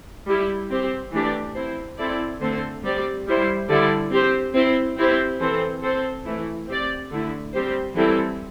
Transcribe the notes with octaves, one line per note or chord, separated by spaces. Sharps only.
G3 E4 G4
C4 G4 C5
E3 A3 D4 G4 D5
C4 E4 C5
C4 E4 A4 D5
D3 A3 C4 A4 C5
G3 C4 G4 D5
G3 E4 C5
D3 G3 E4 A4 D5
C4 G4 C5
C4 E4 C5
C4 E4 G4 C5
E3 C4 A4 C5
C4 A4 C5
E3 A3 E4
C4 G4 D5
D3 A3 E4
G3 C4 G4 C5
E3 G3 C4 E4 A4